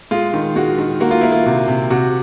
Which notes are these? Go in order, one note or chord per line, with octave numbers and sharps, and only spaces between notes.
G#3 F4
D#3
G#3 F#4
D#3
A#3 F#4
F4
A#3 E4
F4
C3 F#4
C3
C3 F#4